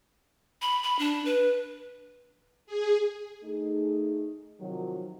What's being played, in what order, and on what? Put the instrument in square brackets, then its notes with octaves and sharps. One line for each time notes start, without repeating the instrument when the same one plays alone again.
[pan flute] B5
B5
D4
B4
[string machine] G#4
[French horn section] A3 D#4 G#4
C3 D#3 F3 F#3